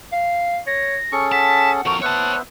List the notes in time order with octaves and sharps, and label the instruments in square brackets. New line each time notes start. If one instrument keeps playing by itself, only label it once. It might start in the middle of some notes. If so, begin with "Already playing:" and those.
[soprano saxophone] F5
[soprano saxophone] C#5 [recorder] A#6
[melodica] C#4 G#4 A4 [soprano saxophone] C#6
[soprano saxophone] F#5 [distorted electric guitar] A5 [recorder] B6
[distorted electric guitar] F2 A#4 [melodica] F#4 A4 C5 [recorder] C#6
[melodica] B3 C5 E5 [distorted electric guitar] C#5 A5 [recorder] F#6